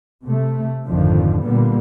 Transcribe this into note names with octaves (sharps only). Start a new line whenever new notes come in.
C3 A3
G#1 F2 D3 D#3 F3
A#2 D3 G3 A#3 B3